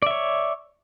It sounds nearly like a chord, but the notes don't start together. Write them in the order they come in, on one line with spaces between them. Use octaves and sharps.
D5 E5 C#5